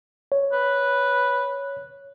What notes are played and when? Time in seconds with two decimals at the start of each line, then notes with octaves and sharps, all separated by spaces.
0.32 C#5
0.52 B4